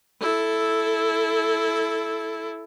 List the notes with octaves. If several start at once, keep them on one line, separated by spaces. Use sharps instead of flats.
E4 A4